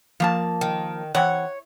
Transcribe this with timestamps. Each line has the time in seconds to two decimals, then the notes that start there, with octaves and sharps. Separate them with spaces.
0.20 F3 A#3 A5
0.61 D#3
1.15 C3 E3 C#5 F#5